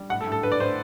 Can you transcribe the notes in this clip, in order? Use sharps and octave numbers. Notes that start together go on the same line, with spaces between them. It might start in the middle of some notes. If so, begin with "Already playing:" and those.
Already playing: G3
A2 F#5
A4
A2
A4
A2 B4
D5
A2 C5